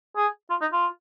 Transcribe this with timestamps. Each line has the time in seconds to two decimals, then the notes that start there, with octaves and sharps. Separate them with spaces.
0.17 G#4
0.50 F4
0.61 D#4
0.73 F4